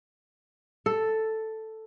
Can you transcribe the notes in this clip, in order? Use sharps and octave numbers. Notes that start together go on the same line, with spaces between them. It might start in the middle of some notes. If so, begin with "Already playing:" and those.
A4